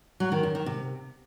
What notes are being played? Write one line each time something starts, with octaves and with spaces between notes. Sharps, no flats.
F#3
D#3
F#2
D#3
C3